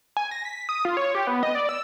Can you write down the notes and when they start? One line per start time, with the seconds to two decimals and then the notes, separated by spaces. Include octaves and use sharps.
0.17 G#5
0.31 A#6
0.45 B6
0.69 D#6
0.85 F4
0.97 C#5
1.15 G4
1.27 B3
1.43 D#5
1.55 D5
1.69 E6